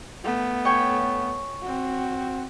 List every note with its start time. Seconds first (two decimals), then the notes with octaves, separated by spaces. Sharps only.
0.24 A3 B3
0.65 C#5 G5 G#5
1.62 C4 F#4